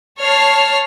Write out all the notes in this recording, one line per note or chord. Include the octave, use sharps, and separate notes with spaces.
C#5 A5 F6 C7